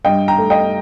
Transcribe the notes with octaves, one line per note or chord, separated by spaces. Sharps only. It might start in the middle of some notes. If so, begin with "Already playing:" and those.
G2 D#5 G5
G5 A#5
A3
D#5 G5